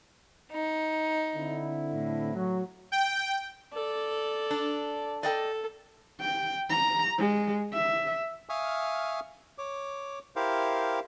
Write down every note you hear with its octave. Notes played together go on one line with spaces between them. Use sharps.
D#4
D3 C4 E4
A2
F#3
G5
A4 D5
D4
A4 D5 D#5 G5
G5
A#5
G#3
E5
E5 F5 G#5 C#6 D#6 F6
C#5 D6
E4 G4 A#4 C5 F5